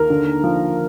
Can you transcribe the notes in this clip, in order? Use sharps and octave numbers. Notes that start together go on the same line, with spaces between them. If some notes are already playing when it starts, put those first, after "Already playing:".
Already playing: D#2 A#4
D3
F3